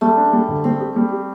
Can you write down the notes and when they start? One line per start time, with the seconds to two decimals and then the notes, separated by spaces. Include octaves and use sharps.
0.01 G3 A3
0.17 D4
0.33 G3
0.48 D2
0.64 G3 C4
0.80 G4
0.96 G3
1.12 G4